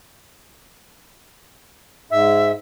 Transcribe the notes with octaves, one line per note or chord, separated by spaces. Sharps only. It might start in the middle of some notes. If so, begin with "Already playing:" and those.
G#2 E5